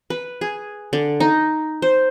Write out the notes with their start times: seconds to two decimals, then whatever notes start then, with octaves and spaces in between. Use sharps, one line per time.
0.10 B4
0.41 G#4
0.93 D3
1.20 D#4
1.82 C5